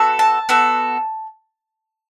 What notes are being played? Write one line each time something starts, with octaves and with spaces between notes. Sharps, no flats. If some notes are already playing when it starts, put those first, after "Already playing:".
Already playing: B3 F#4 A4
A5
B3 F#4 A4